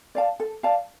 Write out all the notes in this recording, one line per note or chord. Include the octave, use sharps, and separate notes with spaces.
D5 F5 A5
A4
D5 F5 A5